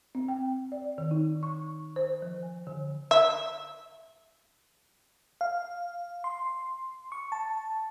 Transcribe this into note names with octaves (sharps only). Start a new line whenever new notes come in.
C4
G5
D5
D#3
D#4
C#6
C5
F3
G#5
D3
E5
F5
C6
C#6
A5